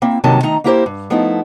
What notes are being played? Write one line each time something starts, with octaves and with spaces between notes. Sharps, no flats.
A#3 C4 E4
G2 C3 D#3 F#3 A#3 A5
D#3 A3 D#4 A#5
A#3 B3 E4 G4 A#4 C5
G2
F3 A3 B3 D#4 E4